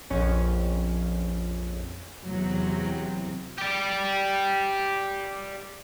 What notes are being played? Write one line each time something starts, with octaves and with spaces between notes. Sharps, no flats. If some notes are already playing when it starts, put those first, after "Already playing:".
A#1 F2 C#4
E2 C3 F#3
G4 D5